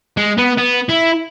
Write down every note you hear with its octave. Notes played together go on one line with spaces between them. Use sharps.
G#3
B3
B3
E4